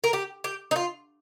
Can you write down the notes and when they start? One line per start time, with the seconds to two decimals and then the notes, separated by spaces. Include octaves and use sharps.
0.04 A#4
0.13 G4
0.44 G4
0.71 D#4
0.76 F4